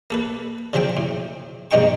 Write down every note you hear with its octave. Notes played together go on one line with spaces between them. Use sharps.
A#3 A4 B4
C#3 F3 F#3 C4 G5
A2
A#1 G2 G#3 D#4 G5 C#6